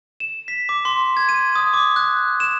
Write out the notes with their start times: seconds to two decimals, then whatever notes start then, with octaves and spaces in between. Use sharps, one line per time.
0.20 E7
0.48 B6
0.69 D6
0.85 C6
1.17 G#6
1.29 D#7
1.56 D#6
1.74 D6
1.96 F#6
2.40 E7